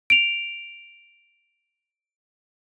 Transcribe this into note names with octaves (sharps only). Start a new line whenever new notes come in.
D7 F7